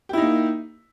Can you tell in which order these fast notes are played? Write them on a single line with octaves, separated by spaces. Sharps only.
G4 E4 D#4 A#3